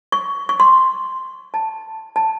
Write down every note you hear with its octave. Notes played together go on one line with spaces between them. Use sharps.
C#6
C#6
C6
A5
A5